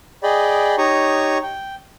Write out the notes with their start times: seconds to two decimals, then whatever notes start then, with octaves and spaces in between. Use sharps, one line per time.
0.23 G#4 D5 D#5 G5 B5
0.78 D#4 G4 C#5 A#5 C#6 D#6
1.43 G5